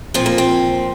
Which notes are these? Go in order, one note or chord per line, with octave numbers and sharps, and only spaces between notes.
A#2 F3 C4
A#3
C4